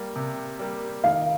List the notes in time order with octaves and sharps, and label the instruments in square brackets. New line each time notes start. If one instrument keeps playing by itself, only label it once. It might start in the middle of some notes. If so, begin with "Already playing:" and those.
Already playing: [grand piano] G3 A#3
C3
G3 A#3
[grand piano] D#3 [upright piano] F5